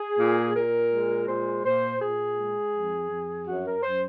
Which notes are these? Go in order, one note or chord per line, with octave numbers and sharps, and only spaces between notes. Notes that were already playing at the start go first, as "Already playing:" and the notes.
Already playing: G#4
A#2
A#2 A#4
G#3
A#2 C5
A#2 C5
A#2 G#4
G#3
F2
F2
F#2 F#4
A#4
F#2 C5